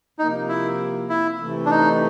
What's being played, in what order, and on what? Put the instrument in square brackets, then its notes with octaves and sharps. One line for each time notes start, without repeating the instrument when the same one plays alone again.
[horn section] C3 F3 A#3 [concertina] D#4
[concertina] E4
E4
[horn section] C3 E3 A3
[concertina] D4
D#4